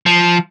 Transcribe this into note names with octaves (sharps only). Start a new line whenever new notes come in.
F3